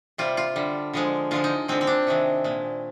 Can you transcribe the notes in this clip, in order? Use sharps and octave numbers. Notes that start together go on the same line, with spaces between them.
C3 G3 F4
F4
D3 G3
D3 F3 G#3
D3 F3 G#3 F4
D#4
D3 G#3 C4
C4
D4
C3 D#3 G#3
A#2 G#3